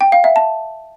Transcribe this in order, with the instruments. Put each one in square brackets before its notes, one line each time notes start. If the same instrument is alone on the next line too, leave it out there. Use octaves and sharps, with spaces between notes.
[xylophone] G5
F5
E5
A5